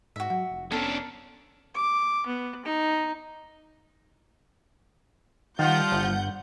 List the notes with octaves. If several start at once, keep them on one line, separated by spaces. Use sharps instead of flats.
G#2 F#4 E5
F#3 F#5
F1
B3 C#4 D4 A4 A#4
D6
B3
D#4
D#3 F3 G3 F4 F#5 G6
G1